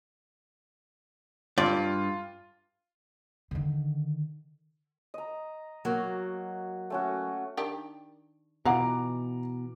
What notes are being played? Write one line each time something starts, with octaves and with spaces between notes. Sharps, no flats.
G2 F4 D5
D3 D#3
D#5 A#5
F#3 A#3 F#4
A3 C#4 F#4
D#3 D4 G4
B2 E3 F4 F5 F#5 A#5 D6